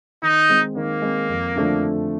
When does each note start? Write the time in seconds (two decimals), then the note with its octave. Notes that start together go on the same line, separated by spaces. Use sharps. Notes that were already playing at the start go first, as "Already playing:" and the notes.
0.23 D#3 D#4
0.49 G#3 C4
0.75 D#3 A#3
1.02 G#3 C4
1.28 F2
1.55 D3 F3 A3 D4